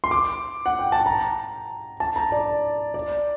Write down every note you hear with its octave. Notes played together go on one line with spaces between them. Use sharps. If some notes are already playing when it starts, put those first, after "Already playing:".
C6
D6
F#5
G5
A5
A#5
A5
A#5
D5
D5